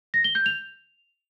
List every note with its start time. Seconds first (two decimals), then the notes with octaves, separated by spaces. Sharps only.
0.14 A#6
0.24 G7
0.35 G6
0.46 F7